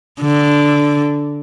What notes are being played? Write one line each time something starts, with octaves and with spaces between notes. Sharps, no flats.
D3